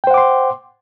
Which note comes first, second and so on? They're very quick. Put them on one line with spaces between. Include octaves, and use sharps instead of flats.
G5 C5 F#5 D6 C6